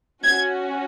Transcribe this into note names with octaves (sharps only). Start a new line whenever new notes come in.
C#4 F#4 G#6